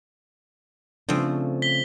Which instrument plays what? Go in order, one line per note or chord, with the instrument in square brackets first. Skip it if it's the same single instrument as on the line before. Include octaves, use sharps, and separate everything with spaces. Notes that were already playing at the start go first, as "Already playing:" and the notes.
[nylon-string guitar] C#3 A3 D4 [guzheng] F3 C4
[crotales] B6 G7